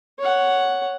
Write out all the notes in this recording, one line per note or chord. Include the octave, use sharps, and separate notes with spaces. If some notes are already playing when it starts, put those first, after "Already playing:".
C#5 F#5